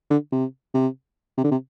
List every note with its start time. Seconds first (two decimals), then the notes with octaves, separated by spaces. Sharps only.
0.11 D3
0.32 C3
0.75 C3
1.38 C3
1.44 D3
1.52 C3